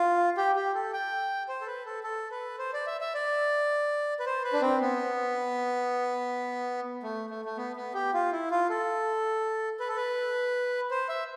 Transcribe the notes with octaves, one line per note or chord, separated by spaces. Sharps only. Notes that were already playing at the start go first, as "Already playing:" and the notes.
Already playing: F4
G4
G4
A4
G5
C5
A4
B4
A4
A4
B4
C5
D5
E5
E5
D5
B4
C5
B4
D4
C4
B3
A3
A3
A3
B3
B3
G4
F4
E4
F4
A4
B4
A4
B4
C5
E5